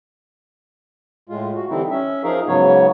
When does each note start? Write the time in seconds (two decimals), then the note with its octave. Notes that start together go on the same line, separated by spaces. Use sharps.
1.29 A2 G#3 F4
1.56 F#4
1.70 D3 E3 G3 C4 D#4 E4
1.90 C#4 E5
2.24 F3 D#4 G#4 A#4 F5
2.47 G#2 C#3 F#3 B3 C#5